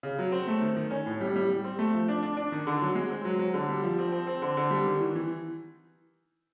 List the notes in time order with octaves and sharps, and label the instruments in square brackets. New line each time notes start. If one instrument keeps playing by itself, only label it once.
[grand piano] C#3
F#3
C4
A3
D#3
D#3
C#4
A2
G3
G3
G3
C4
A3
F3
D4
D4
D4
D#3
D3
F#3
G#3
C4
F#3
F#3
D3
G3
F3
C4
C4
C4
D3
D3
G3
D#3
E3
E3